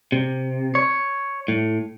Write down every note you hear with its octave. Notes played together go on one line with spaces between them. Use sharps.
C3
C#5
A2